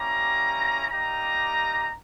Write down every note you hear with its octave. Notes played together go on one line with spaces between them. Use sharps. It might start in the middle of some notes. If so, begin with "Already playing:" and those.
Already playing: G3 A#3 C#4 E4 G4 A#5
G3 A#3 D#4 G4 A#5